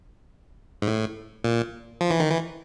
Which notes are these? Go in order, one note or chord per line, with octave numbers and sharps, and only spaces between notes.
G#2
A2
A#2
F3
E3
D#3
E3